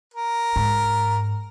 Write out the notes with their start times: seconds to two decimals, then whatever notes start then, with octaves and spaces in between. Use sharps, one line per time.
0.14 A#4
0.56 G#2